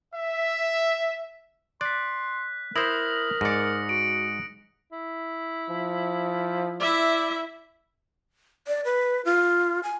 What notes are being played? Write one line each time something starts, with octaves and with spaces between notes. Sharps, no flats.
E5
D5 C6 F#6 B6
E4 A#4 C5 D#6 A#6 F#7
G#2 D5 A#6 C#7
F#4 D7
E4
F3
E4 D5 E5
D5
B4
F4
G#5